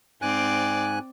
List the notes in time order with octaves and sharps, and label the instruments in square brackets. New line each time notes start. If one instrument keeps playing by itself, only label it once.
[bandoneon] G#2 G#5 F#6 [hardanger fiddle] C4 D5